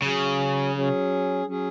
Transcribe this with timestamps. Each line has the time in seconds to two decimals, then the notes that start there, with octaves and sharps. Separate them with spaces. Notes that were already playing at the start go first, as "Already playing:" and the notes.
0.02 C#3 F#3 C#4 G#4
0.74 F#3 C#4 G#4
1.46 F#3 C#4 G#4